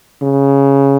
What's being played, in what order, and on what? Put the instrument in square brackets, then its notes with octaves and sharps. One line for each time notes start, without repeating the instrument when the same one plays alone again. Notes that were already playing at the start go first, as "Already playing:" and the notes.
[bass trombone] C#3